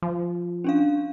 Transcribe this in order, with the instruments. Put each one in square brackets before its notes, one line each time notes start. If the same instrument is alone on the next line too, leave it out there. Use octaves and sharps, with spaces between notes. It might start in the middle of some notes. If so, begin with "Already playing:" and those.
[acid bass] F3
[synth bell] C#4 D4 F5